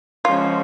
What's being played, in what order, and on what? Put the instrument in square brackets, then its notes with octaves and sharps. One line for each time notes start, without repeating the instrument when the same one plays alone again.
[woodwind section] C#3 F3 G#3 C#4 F#4 [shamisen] F4